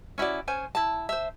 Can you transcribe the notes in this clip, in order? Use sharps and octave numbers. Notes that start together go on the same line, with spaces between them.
C#4 E4 F#4 D5
C#4 C5 G#5
E4 A5
C5 E5